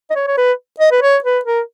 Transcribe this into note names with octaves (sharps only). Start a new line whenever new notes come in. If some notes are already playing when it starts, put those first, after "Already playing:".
D#5
C#5
C#5
B4
D#5
B4
C#5
B4
A#4